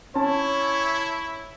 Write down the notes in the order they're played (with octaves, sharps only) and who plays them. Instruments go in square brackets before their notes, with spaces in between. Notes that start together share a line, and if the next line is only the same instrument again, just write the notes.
[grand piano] C#4 A5 [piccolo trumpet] E4 [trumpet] C#5